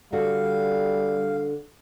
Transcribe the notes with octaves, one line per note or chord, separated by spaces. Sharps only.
D3 G3 F#4 A4 F5